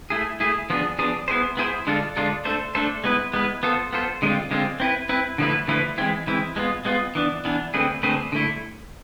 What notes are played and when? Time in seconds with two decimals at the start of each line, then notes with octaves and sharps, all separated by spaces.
0.10 A3 E4 G#4
0.40 A3 E4 G#4
0.70 F3 B3 D4 G#4
0.99 F3 B3 D4 G#4
1.28 B3 E4 G#4 C5
1.57 B3 E4 G#4 C5
1.87 D3 G#3 D4 F4 A4
2.17 D3 G#3 D4 F4 A4
2.45 A3 D4 A4 C5
2.75 A3 D4 A4 C5
3.04 G#3 B3 E4 B4
3.34 G#3 B3 E4 B4
3.63 B3 F4 A4 C5
3.93 B3 F4 A4 C5
4.22 D3 G#3 C4 F4
4.51 D3 G#3 C4 F4
4.80 C4 E4 B4
5.09 C4 E4 B4
5.38 D3 F3 A3 E4 B4
5.68 D3 F3 A3 E4 B4
5.98 E3 G#3 C4 E4
6.27 E3 G#3 C4 E4
6.56 G#3 B3 F4
6.85 G#3 B3 F4
7.15 E3 B3 D4
7.45 E3 B3 D4
7.74 D3 A3 C4 G#4 B4
8.03 D3 A3 C4 G#4 B4
8.32 D3 A3 E4